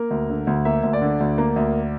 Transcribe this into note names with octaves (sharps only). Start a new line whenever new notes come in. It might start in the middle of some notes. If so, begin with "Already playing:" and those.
Already playing: A#3 A#4
D2
D3
D2
A#3 E5
D2
D5
D3
D2
A#3
D2